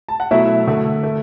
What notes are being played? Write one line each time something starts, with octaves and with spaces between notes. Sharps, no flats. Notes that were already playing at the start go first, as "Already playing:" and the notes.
A5
F#5
B2 F#3 A3 E4 E5
D3 A3
A3